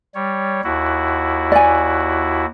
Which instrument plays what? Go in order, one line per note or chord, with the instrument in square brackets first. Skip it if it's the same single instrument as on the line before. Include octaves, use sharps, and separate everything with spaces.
[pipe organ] G3 C#5
D#2 E4 F#4
[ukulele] D5 G#5